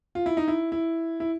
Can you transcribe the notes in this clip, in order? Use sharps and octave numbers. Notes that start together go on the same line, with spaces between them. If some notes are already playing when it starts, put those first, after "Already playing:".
F4
E4
D#4
E4
E4
E4